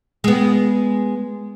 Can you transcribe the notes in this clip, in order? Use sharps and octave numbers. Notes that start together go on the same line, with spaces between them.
G#3 B3